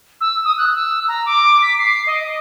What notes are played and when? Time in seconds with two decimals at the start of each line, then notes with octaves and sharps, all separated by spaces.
0.21 E6
0.45 D#6
0.58 F#6
0.75 E6
1.08 A#5
1.26 D6
1.62 B6
1.79 C7
2.06 D#5